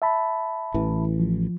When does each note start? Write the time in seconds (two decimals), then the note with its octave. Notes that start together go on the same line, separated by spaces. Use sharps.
0.02 E5 A5 B5
0.74 A1 E3
1.19 F3